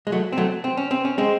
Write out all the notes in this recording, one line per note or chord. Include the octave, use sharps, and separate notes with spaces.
G#3
F#3 A3
C4
F#3 A3
C4
C#4
C4
C#4
G#3 C4